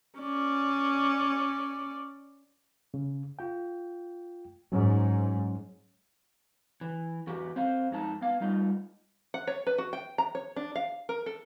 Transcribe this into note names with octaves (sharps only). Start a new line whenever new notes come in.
C#4 D5
C#3
F4 G5
G#2 F#3 C#4 C#5
E3
E2 F#4 G4
C4 C5 F5
F2 G#3 D#4 A5
B3 F5
G3 A3 D#4 F4 D#5
F#5
C#5
B4
F#4
G5
A#5
C#5
D4
F5
A#4
A4